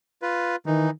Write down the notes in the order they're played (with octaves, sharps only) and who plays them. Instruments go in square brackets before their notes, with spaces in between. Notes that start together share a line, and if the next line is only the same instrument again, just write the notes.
[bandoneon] F4 B4
[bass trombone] D#3 [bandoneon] E3 D#4